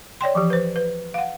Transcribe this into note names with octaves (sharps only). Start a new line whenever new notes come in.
C#5 D5 G5 C6
E3 F3 G4
B4 C5
B4
F5 F#5